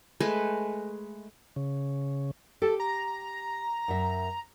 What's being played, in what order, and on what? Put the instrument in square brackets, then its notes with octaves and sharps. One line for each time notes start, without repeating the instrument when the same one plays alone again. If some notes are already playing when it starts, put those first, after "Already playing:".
[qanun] G#3 A3 B4
[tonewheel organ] C#3
[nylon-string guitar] G4 [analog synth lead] A4
[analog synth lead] A#5
[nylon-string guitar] F#2 E5